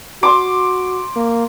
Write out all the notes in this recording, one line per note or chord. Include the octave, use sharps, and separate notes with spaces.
F#4 C6 D6
A#3